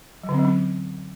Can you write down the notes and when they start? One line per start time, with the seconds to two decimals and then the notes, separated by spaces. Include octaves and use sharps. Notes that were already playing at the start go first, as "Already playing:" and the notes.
0.23 F#3
0.29 D3
0.34 C4
0.39 F#3
0.45 C#4